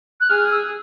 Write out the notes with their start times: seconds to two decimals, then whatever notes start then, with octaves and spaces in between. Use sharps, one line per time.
0.21 F#6
0.29 G#4 F6
0.51 E6